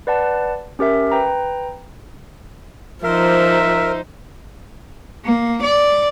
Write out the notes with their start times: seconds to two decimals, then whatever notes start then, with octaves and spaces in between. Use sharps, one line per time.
0.07 B4 D5 F#5 A5
0.79 C#4 G4 A#4 E5
1.12 B4 G5 A#5
3.04 F3 D#4 A#4 C5 E5
5.25 A#3
5.62 D5